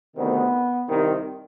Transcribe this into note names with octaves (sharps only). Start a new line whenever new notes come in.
D2 C3 D#3 B3
C2 C3 D#3